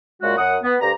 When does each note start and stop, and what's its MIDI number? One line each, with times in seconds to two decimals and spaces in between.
0.23 0.36 46
0.23 0.36 49
0.23 0.36 56
0.23 0.36 66
0.38 0.56 42
0.38 0.56 78
0.38 0.56 87
0.64 0.76 59
0.82 0.91 38
0.82 0.91 43
0.82 0.91 67
0.82 0.91 82